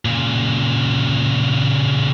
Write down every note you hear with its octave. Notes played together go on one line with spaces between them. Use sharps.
A#2 C#3